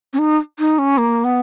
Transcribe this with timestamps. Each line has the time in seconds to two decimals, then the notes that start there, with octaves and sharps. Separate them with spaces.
0.13 C#4
0.19 D#4
0.59 D#4
0.79 C#4
0.98 A#3
1.24 B3